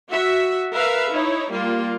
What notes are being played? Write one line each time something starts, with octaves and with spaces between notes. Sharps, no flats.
F#4 E5
A#4 B4 E5 F5
D#4 E4 C#5
G3 A#3 F4